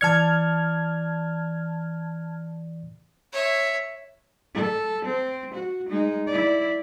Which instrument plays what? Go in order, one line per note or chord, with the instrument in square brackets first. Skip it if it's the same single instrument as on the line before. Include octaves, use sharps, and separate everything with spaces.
[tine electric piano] E3 D5 C#7 [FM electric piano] A5 F6 G#6
[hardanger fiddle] C#5 E5
[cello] A4
C4
F#4
G#3 D#4
E4 D5